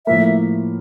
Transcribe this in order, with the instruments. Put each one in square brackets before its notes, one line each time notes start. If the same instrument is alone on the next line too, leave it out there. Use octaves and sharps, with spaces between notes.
[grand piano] A2 F3 A#3 [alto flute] E5